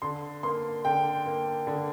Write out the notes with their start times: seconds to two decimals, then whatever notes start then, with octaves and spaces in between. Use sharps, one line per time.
0.02 D3 C6
0.43 A#3 C6
0.85 D3 G5
1.26 A#3
1.67 D3